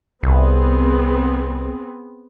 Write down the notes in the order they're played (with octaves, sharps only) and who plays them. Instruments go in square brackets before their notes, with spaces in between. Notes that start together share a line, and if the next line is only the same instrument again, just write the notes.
[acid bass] C2 [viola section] B3 C4 G#4